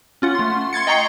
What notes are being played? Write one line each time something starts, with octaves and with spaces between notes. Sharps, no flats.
C#4 F4 F#5
A3 C6
C6 G#6 A6 C#7
D#5 G5 A#5 C#6 C7 C#7